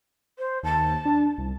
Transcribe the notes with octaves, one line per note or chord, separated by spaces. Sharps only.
C5
D#2 A5
D4
C2